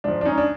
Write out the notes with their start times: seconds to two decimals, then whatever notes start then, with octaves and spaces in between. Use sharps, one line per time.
0.04 G#2 F3 D4
0.21 D4
0.25 C#4 D#4
0.38 D4